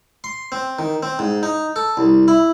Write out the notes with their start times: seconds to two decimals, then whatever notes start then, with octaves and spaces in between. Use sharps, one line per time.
0.24 C6
0.52 C4
0.79 D#3
1.03 C4
1.19 G#2
1.43 D#4
1.76 A4
1.97 C2
2.28 E4